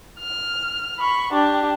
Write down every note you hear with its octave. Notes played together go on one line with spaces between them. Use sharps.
F6
B5 C#6
D4 G4